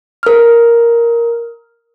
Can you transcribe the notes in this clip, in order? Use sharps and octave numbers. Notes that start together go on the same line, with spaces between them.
A#4 F6